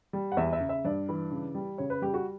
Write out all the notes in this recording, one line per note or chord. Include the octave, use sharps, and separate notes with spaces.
G3
F#5
E2 E5
E5
C#3
E5
G2 D5
E3
C#3
G3
C#3 C#5
B4
G3 G4
F#4